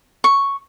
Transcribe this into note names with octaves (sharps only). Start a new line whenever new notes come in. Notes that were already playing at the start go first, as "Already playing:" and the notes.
C#6